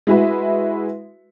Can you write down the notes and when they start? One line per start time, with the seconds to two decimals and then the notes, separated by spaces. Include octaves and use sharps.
0.07 G#3 E4 F#4 B4 E5